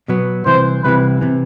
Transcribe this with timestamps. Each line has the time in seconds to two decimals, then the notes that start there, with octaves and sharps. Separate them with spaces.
0.08 B2 F#3 B3
0.46 C2 C3 E3 C5
0.84 C2 C3 E3 B4
1.21 C3 E3